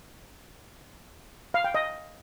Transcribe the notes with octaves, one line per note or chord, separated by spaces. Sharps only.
F5
G5
D#5